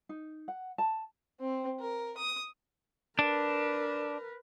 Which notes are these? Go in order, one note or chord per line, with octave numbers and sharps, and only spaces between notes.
D#4
F#5
A5
C4
A#4
D#6
D4 A#4 B4